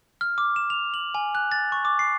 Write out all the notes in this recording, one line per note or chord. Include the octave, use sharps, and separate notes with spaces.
F6
D6
E7
F7
F#7
G#5
F#6
A6
C#6
D6
C7